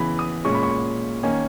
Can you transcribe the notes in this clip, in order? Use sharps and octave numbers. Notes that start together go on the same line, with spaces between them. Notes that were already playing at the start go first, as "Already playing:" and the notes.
Already playing: C#3 E3 B3 B5
D#6
A#2 G#3 C#4 C#6
B5
C#6
D#3 A#3 C#4 G#5